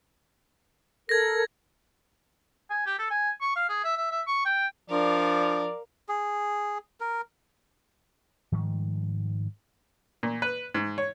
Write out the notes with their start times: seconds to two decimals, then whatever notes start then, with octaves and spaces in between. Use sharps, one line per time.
1.09 A4 A#4 G#6 A#6
2.70 G#5
2.86 G4
2.99 A4
3.10 G#5
3.41 C#6
3.56 F5
3.69 G#4
3.84 E5
3.97 E5
4.11 E5
4.27 C#6
4.46 G5
4.90 F3 D4 A#4 D5 F5
6.09 G#4
7.00 A#4
8.52 G#2 D#3 F3 G3
10.23 A#2
10.42 B4
10.74 G#2
10.98 C#5